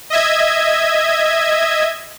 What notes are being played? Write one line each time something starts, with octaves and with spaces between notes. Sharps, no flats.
D#5 E5 G#6